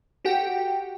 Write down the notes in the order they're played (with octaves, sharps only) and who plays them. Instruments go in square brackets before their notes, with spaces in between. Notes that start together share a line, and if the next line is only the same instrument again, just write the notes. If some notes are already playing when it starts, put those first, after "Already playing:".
[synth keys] F#4 G4 A4 F#5 G5